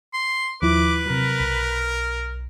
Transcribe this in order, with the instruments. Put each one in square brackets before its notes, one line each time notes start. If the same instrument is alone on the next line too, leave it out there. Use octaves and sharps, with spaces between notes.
[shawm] C6
[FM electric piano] D#2 F3 E4 [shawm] B4 [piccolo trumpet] D6
[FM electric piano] C3 F#3 [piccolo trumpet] A#4
[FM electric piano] B1